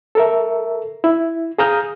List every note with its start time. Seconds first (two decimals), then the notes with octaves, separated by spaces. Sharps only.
0.15 A4 A#4 E5
1.04 E4
1.58 G#4 F5 A#5 D#6 F6 G6